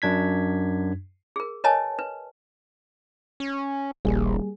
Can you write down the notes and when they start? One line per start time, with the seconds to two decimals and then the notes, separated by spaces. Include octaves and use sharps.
0.02 F#2 D4 G#6 B6
1.36 G#4 A#4
1.64 A#4 B4 C#5 D#5 G#5 A5
1.99 B4
3.40 C#4
4.05 D#1 A#1 G3 A#3 G#4